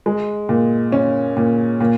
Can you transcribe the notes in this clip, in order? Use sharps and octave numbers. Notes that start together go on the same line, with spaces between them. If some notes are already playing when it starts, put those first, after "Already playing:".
G#3
A#2
C#4
A#2
A#2